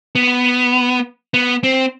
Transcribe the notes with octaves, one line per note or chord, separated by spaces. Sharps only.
B3
B3
C4